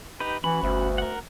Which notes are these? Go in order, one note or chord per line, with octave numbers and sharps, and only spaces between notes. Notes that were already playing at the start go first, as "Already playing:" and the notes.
D#4 G4 B4
E3 C#4 F#4 B5
G1 D2
A#4 F#5